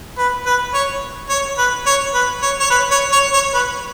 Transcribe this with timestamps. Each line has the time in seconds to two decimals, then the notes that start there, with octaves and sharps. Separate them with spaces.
0.18 B4
0.46 B4
0.74 C#5
1.29 C#5
1.58 B4
1.86 C#5
2.14 B4
2.42 C#5
2.60 C#5
2.70 B4
2.91 C#5
3.12 C#5
3.33 C#5
3.54 B4